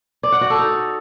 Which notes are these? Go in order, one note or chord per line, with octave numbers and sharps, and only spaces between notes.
D5
F#5
F#4
A4
D#4